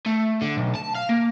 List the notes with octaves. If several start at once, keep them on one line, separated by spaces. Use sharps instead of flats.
A3
D3
B1
A5
F5
A#3